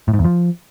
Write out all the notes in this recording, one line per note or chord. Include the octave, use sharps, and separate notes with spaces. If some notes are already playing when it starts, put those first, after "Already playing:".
A2
G#2
E2
F3